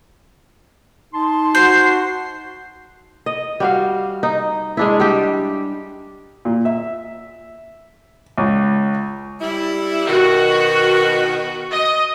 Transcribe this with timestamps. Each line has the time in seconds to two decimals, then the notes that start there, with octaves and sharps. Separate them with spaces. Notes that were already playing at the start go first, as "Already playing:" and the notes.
1.14 D#4 A5 C6
1.55 F#4 C5 C7
3.26 D#5
3.60 G3 F#4 F5
4.23 D#4
4.77 G#3 D4 E4
5.00 G3 G4
6.45 A#2
6.65 E5
8.38 C#2
9.40 G3 E4
10.08 B2 D#3 F#4
11.72 D#5